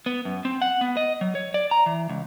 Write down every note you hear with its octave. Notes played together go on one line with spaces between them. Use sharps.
B3
F#2
C4
F#5
B3
D#5
F#3
C#5
D5
A#5
E3
C#2